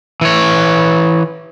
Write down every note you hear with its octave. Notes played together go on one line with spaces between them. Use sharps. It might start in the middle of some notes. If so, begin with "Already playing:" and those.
E3 C#5